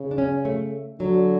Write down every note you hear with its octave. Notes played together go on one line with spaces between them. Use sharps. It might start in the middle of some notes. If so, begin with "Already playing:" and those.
Already playing: C#3
D4
C#4
A3
D3 F#3